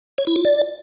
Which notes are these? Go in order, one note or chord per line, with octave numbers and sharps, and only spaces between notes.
C#5
E4
F4
D5